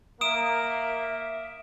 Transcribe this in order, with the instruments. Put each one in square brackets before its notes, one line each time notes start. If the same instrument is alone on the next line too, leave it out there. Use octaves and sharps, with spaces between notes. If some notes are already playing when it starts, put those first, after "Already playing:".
[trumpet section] A#3 A#4 [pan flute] E5 [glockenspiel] D#6 D7 E7